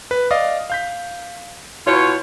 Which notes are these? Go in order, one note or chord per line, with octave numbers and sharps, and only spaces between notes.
B4
D5 D#5 F5
F5 G6 B6
B2 E4 F4 C#5